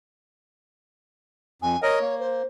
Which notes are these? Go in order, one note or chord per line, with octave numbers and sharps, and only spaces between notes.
F2 G#5
A#4 C#5 D#5
A#3
C5